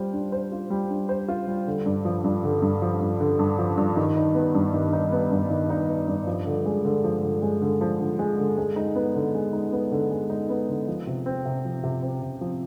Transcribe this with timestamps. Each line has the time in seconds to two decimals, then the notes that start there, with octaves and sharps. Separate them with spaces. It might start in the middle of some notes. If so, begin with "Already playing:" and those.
Already playing: G3 F4 C5
0.13 D4
0.32 C5
0.52 F4
0.70 G3
0.90 D4
1.09 C5
1.28 F4
1.47 G3
1.67 D3
1.86 G2
2.05 F3
2.24 G2
2.44 D3
2.62 G2
2.82 F3
3.01 G2
3.20 D3
3.39 G2
3.59 F3
3.78 G2
3.97 D#3
4.16 D#4
4.35 B3
4.55 G2
4.74 D#3
4.93 D#4
5.12 B3
5.31 G2
5.50 D#3
5.70 D#4
5.88 B3
6.08 G2
6.27 F3
6.46 D3
6.65 G#3
6.85 D3
7.04 F3
7.23 D3
7.42 G#3
7.62 D3
7.81 F3
8.00 D3
8.19 G#3
8.39 D3
8.58 G#3
8.76 D#4
8.95 B3
9.15 D3
9.34 G#3
9.53 D#4
9.72 B3
9.92 D3
10.11 G#3
10.30 D#4
10.49 B3
10.69 D3
10.88 F3
11.07 C3
11.26 C4
11.45 C3
11.65 F3
11.84 C3
12.02 C4
12.22 C3
12.41 F3